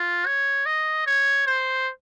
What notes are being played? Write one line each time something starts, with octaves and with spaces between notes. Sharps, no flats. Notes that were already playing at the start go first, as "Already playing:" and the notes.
Already playing: F4
C#5
D#5
C#5
C5